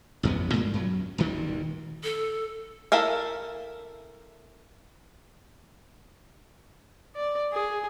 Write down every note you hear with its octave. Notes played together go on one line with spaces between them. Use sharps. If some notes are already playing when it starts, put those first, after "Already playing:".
A1 F2 C3 B3
G2 A#2 G#3 A#3
F#2 F#3
D#1 D2 G2 D#3
A4
E4 A4 A#4 E5 F5
D5
G#4